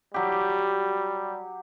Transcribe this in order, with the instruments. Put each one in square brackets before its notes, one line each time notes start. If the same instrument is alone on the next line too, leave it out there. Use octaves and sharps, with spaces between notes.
[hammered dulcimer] F#3 G4 [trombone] G3